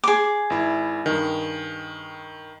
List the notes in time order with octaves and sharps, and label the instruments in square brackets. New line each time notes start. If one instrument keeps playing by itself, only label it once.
[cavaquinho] G#4 D6
[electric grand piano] G#1 E4
G2 D#3